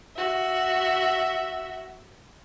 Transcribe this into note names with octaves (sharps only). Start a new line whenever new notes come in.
F#4 E5